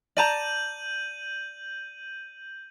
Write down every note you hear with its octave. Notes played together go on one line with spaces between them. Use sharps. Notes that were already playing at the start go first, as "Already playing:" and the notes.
D5 A5 A#5 G6 D#7 F#7